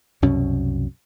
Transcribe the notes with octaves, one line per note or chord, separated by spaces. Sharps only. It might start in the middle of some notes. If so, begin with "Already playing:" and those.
C2 F#2 B2 C#4